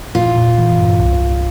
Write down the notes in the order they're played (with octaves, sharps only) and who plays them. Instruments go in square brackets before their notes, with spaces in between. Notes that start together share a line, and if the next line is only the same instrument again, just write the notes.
[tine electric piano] A#2 [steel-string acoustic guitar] F4
[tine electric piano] A#2
E3
G2
C2
C2